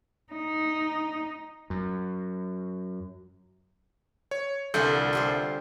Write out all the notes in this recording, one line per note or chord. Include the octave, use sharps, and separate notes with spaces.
D#4
F#2
C#5
C2 D3 E3 F4 A4 G6
F4 G4 C5